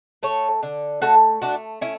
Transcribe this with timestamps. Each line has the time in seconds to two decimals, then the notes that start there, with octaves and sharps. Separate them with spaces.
0.23 A3 A4 C#5
0.63 D3
1.02 A3 F#4 A4
1.42 A3 D4 F#4
1.81 A3 C#4 E4